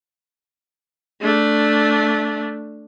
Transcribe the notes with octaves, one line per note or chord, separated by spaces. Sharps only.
A3 D4